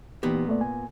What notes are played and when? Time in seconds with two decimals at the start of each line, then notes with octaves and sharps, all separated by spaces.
0.23 A#2 E3 B3 D#4 G4
0.49 A3 A#3 D5
0.61 G#5